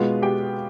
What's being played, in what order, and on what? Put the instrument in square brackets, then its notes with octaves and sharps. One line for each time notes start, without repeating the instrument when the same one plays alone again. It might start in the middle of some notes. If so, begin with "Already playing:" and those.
Already playing: [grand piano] B2 G#3 B3 F4 F5
G4 G5